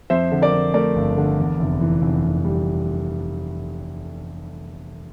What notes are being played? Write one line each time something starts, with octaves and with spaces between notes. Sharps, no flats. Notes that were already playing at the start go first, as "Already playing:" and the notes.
F2 C5 E5
D3
A#4 D5
F2
A3 A#4 D5
G1
D3
E2
F1
E3
F1
F1
G3